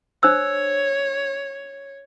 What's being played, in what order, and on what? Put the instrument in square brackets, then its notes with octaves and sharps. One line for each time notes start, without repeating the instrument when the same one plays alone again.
[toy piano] D4 C5 E6 [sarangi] C#5